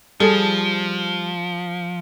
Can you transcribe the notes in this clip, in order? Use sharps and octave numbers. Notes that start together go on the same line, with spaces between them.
F3 G3 G#4 A4